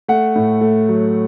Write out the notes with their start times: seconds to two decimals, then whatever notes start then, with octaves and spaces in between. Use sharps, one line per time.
0.08 A3 F#5
0.35 A2
0.61 A3
0.89 F#3